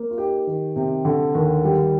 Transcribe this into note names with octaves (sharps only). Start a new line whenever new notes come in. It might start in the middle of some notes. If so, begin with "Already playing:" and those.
Already playing: A#3
F4
D#4 G4
D#3
C3
D3
D#2
G3